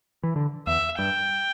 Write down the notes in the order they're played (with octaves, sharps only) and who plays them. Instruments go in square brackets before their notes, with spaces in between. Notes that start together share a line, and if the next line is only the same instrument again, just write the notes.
[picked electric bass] E3
D3
[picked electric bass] E2 [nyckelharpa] E5
[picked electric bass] G2 [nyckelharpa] G5